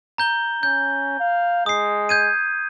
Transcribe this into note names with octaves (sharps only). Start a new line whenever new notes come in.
A#5 G6 G7
C#4 G6
F5
G#3 D#6 C7
G6 G#6 D#7